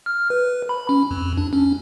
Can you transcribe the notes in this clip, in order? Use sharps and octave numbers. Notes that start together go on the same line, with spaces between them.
F6
B4
B5
C#4
F2
D4
C#4